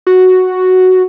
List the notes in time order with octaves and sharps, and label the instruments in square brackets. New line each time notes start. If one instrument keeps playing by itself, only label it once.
[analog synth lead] F#4